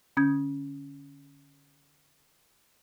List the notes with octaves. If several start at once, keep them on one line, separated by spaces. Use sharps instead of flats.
D3 C#4 D#6 G6 G#6